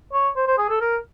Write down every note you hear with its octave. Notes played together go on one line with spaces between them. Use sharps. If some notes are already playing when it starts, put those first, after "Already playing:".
C#5
C5
C5
G#4
A4
A#4